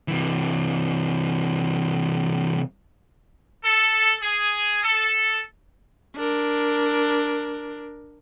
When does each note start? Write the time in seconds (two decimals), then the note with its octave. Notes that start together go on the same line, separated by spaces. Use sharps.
0.08 C3 E3
3.64 A4
4.21 G#4
4.83 A4
6.16 D4 A#4